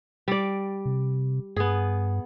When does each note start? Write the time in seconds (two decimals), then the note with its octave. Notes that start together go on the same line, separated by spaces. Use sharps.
0.28 G3 D5
0.86 C3
1.56 G2 B3 G#4